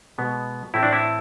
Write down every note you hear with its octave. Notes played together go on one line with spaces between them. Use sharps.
B2 G#3 B3
A2 E3 A3 C4 E4
D4
E4